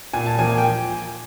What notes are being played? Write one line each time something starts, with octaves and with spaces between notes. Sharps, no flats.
A#2 G#5
A5
F3 A#3 G#5
G5